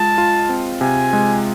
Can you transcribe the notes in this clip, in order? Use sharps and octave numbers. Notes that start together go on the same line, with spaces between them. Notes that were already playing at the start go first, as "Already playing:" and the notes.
Already playing: G#3 F4 A5
F4
C4
C3 G#5
G#3